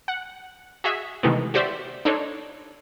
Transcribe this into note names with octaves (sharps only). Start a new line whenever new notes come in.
F#5
F#4 G#4 D#5 E5
C3 D#3 E3 G#3 A3 B3
F#4 G4 C5 D5 E5
D4 D#4 A4 C5 C#5